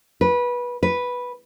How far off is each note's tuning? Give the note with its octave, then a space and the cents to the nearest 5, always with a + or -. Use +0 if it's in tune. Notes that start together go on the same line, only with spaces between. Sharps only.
B4 -20
B4 -5